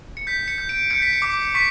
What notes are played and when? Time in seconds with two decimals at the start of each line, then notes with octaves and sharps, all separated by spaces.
0.17 C#7
0.27 G6 B6
0.48 C#7
0.58 G6
0.69 D7
0.90 G6 C#7
1.02 B6
1.13 C#7
1.22 D6
1.55 C#6 B6